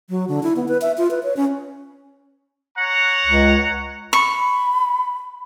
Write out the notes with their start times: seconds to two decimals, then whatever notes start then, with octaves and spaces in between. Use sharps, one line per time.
0.10 F#3
0.28 D3
0.43 E4
0.56 B3
0.68 B4
0.81 E5
0.98 F4
1.11 B4
1.23 C#5
1.37 C#4
2.78 C#5 F#5 A#5
3.26 C#2
4.13 B5 C#6